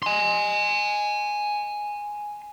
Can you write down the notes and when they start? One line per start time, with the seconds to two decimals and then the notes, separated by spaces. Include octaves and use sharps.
0.03 G#5 C6